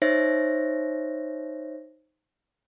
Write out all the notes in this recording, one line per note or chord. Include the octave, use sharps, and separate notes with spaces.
D#4 C5 C#5 E5 A#6